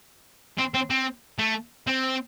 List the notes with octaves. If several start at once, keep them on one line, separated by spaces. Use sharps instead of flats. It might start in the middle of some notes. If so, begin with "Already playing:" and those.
C4
C4
C4
A3
C4